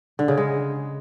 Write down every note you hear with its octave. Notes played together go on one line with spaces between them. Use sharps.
D3
C#3
G#3